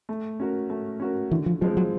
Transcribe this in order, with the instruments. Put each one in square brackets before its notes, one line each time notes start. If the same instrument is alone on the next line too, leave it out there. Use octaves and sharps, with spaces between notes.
[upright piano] A3
C#4 F#4 A#4
A3
C#4 F#4 A#4
[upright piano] D3 [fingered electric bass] E3
[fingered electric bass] F3
[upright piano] F3 G#3 C4 [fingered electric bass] F#3
[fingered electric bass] F#3